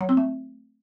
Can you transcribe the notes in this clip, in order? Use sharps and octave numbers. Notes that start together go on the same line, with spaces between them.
F#3
C4
A3